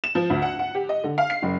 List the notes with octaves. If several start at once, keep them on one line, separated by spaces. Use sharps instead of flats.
E7
F3
D2
F#5
F#5
G4
D#5
D3
F5
C7
F#1